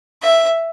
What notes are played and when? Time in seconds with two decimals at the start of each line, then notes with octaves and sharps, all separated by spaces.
0.22 E5